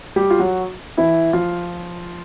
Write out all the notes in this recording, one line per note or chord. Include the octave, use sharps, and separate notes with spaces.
G3 G4
F4
F#3 F#4
E3 E4
F3 F4